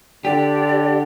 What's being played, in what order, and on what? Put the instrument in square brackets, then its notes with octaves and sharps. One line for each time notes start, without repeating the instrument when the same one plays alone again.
[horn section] D3 [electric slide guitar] G4 [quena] D5